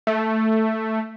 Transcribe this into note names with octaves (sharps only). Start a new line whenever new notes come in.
A3